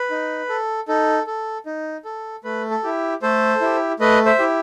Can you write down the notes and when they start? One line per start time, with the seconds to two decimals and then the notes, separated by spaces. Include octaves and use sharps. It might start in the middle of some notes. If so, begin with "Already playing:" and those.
Already playing: B4
0.10 D#4
0.49 A4
0.88 D#4 A4
1.27 A4
1.66 D#4
2.05 A4
2.44 A3 B4
2.71 A4
2.84 E4 G4
3.22 A3 A4 C5
3.61 E4 G4
4.00 A3 B4 D#5
4.26 C5 E5
4.39 E4 G4